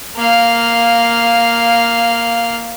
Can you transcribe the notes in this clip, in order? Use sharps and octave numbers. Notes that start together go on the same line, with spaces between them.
A#3 F5